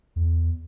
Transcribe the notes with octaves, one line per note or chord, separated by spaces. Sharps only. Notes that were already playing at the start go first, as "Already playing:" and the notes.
E2